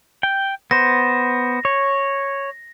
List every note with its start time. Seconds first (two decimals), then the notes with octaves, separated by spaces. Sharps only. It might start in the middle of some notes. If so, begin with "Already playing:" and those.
0.23 G5
0.71 B3 C5 A#6
1.65 C#5